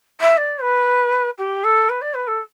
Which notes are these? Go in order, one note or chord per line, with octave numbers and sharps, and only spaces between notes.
E5
D5
B4
G4
A4
B4
D5
B4
A4